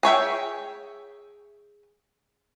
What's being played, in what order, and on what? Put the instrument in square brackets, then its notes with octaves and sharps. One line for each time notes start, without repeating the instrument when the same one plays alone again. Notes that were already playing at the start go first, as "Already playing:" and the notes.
[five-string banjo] G#4 C#5 E5 G5